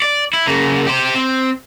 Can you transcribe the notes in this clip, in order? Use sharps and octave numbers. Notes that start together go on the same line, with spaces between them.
D5
E4
C#3 A#3
G4 C5
C4